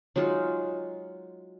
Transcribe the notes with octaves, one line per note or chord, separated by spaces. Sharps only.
F#3 G#3 D#4 F4